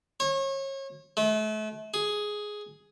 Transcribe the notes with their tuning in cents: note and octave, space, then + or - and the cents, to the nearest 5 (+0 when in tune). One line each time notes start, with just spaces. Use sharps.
C#5 -35
A3 -35
G#4 +5